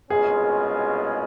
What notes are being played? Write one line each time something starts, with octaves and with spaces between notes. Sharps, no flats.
C2 B2 G#3 C#4 F4 G#4